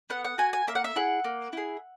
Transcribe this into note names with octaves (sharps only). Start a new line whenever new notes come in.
B3 F#5
F#5
F#4 G#5
G#5
A#3 E5
F#5
E5
E4 G#4 F#5
A#3
E4 G#4